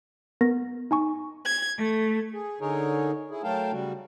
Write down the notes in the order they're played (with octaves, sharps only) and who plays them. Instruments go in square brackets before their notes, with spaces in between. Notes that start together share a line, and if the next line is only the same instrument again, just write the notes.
[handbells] B3 A#4 A#6
D#4 G#5 C#6
[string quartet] G#6
A3
[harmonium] G#4
D3 D#4 G#4 A#4 C#5
E4 G#4
F#3 A3 A#4 F5 G5 A5
C#3 G3 F#4